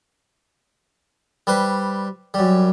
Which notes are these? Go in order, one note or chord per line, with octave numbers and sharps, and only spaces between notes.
G3 B4 C5
F#2 G3